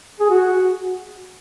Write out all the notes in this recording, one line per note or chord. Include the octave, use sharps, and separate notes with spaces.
G#4
F#4